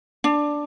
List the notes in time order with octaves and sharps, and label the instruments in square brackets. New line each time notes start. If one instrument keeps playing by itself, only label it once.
[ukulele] D4